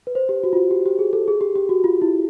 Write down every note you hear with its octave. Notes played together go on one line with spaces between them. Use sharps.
B4
C5
G4
F#4
F4
F#4
G4
G4
G#4
A4
G#4
G4
G4
F#4
F4
E4